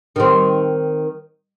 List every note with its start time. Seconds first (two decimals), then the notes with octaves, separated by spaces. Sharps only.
0.16 D#3 C4